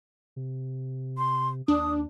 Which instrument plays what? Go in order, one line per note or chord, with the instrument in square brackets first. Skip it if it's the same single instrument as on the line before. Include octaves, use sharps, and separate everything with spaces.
[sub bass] C3
[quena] C6
[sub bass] D#2 [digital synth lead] D4 [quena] D#6